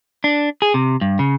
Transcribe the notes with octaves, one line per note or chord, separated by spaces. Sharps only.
D4
G#4
C3
G2
C#3